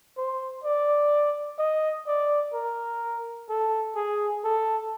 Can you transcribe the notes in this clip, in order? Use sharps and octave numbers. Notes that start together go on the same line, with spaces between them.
C5
D5
D#5
D5
A#4
A4
G#4
A4